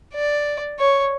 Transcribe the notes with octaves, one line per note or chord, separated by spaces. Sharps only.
D5
C#5